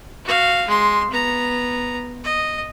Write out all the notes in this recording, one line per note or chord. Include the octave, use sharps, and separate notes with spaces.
F#4 F5
G#3 C6
B3 A#5
D#5